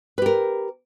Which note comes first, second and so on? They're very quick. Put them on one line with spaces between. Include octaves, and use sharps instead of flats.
B4 G4 A#4